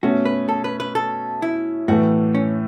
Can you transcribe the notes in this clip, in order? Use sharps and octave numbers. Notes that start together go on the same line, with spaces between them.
B2 A3 C#4 F#4
B4
A4
B4
B4
A4
E4
A2 E3 A3 F#4
C#4